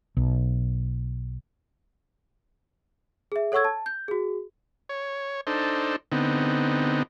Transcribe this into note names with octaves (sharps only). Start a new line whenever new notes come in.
B1
G#4 E5
A4 C#5 F#5 C#6 E6 G#6
A5
G6
F#4 G#4
C#5
D4 D#4 A4 C5
D3 B3 C4 D#4